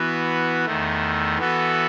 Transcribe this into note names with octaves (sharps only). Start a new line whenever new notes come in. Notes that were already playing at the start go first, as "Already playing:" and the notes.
Already playing: E3 B3 F#4
E2 D#3 A3
E3 B3 F#4 A4